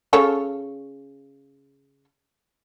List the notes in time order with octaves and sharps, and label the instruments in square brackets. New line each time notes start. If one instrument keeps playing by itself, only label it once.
[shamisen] C#3 A4 C#5